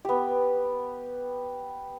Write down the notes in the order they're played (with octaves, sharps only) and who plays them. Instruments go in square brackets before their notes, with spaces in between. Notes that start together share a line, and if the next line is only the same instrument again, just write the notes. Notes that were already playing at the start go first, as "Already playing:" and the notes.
[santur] B3 G4